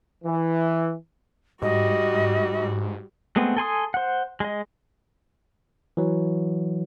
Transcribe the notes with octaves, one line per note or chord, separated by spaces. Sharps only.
E3
G#2 G3 F#4 D#5
G#3 A3 B3 C4
A4 G#5 C6 D#6
C5 F#5
G#3 D#5
E3 F#3